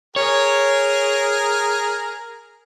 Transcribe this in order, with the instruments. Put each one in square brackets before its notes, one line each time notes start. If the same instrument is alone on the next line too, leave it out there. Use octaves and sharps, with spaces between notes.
[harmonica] G#4 A#4 [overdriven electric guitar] C#5